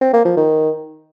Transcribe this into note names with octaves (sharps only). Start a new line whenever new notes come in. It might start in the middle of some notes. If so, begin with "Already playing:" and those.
C4
A#3
F3
D#3